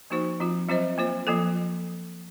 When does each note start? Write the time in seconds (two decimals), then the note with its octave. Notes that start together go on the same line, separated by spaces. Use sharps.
0.10 F3 A#3 D#4 F#4 C5
0.40 F3 C4 F4
0.69 F#3 C4 F4 C5 D#5
0.98 A#3 F4 C5
1.27 F3 A#3 F4 A4